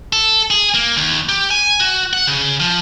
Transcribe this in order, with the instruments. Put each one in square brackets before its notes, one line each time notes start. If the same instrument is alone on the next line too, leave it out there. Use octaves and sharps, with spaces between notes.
[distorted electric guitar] A4
G#4
A#3
D#2
G4
G#5
F#4
F#5
C#3
F3